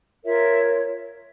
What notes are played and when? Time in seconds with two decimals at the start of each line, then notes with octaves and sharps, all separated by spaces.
0.24 F4 A#4 C#5 E5